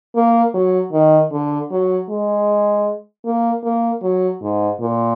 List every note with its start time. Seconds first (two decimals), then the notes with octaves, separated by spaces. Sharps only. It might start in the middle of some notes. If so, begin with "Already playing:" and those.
0.16 A#3
0.54 F#3
0.93 D#3
1.32 D3
1.71 F#3
2.10 G#3
3.25 A#3
3.64 A#3
4.03 F#3
4.42 G#2
4.81 A#2